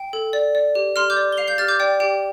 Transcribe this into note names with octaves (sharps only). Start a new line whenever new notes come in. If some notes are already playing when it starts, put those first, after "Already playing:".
Already playing: G5
A4
D5
D5
G4
G4 C6 F6
D6 G6
D5
G7
F5 C7 F7
G6 C7
G4 F6 A6
D6 G6
D5 G5
G4 G5